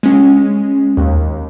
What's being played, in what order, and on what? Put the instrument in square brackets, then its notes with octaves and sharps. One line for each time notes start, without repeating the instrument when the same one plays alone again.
[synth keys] G#3 C#4
D#2